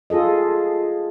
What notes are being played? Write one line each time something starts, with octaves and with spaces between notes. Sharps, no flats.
F4 G#4 A4 D#5